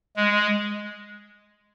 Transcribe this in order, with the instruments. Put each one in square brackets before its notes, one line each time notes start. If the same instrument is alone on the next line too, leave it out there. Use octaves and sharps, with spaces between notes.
[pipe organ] G#3